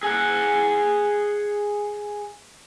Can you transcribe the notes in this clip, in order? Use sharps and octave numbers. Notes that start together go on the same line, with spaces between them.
G#4 F#5